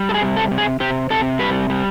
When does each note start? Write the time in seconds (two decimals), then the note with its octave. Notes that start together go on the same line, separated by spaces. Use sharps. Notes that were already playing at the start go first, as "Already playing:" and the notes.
Already playing: G3
0.09 A4
0.14 G#4
0.21 C3
0.37 A4
0.51 C3
0.58 G#4
0.80 C3 G4
1.10 C3 A4
1.39 G3 B4
1.70 G3